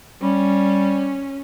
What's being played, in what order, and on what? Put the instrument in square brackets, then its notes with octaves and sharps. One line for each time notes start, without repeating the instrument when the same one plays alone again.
[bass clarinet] G3 [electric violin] C#4